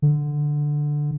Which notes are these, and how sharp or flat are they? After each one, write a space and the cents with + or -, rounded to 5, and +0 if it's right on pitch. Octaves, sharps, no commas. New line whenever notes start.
D3 +5